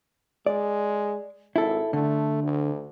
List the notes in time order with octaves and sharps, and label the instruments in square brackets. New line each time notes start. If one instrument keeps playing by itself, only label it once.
[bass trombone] G#3 [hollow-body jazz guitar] D5
[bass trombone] G#1 [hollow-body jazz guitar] E4 A4
[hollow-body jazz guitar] D3 [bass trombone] A3
[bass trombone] D2